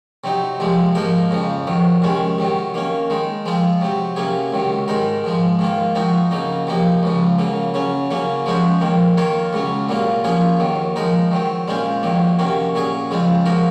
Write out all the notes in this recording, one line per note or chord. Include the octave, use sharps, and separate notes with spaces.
C3 F#3 C4 D#4
C2 C3 F3 G#3
G#2 F3 A#3 D#4 A#4
F2 C#3 F3
F2 D#3 F#3
C3 D#3 G#3 C#4
C3 D#3 F#3
D#3 A#3 C#4
D#3 G#3 D#4
F3 G#3 C4 F4
C3 F#3 C4
C3 F#3 A#3 C#4 G#4
C#2 C3 D#3 F#3
G#2 D#3 G#3 D#4 A#4
G#2 F3 G#3
G#2 D#3 A#3 F4
F3 C4 D#4 F#4
C#3 F#3 A#3 D#4
C3 F3 A#3 D#4
C#2 C#3 F3
C#3 F#3 A#3
C#3 F#3 C#4
C#3 F#3 A#3 C#4
F3 G#3 C#4 F#4 C5
F2 D#3 A#3
D#3 A#3 F4 A#4 C#5
C#2 C#3 F#3 C#4
C2 A#2 F#3 A#3 F4
F3 A#3 C#4 F4 G#4
D#2 D#3 F#3
F3 G#3 D#4 A#4
D#3 F#3 C4
A#2 G#3 C#4 F4 C5
F2 D#3 F#3 A#3
C3 D#3 A#3 C#4 F#4
A#2 F#3 C#4 G#4
F2 C#3 G#3 C4 F4
F3 A#3 D#4 F#4 A#4